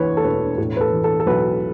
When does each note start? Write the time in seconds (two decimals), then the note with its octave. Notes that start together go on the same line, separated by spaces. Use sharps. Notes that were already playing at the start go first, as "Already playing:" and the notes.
Already playing: D2 E3 B4 C#5
0.17 A4
0.24 E1 B4
0.58 A2
0.77 B4
0.81 A4
0.93 E3
1.04 A4
1.20 A4
1.26 B1 B4